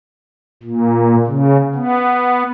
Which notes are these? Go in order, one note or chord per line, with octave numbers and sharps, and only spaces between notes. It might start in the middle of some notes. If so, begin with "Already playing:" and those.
A#2
C#3
B3